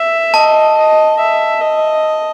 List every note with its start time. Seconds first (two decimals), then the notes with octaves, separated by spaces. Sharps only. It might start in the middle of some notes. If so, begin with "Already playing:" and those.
Already playing: E5
0.34 D#5 A5
0.77 D#5
1.19 E5
1.61 D#5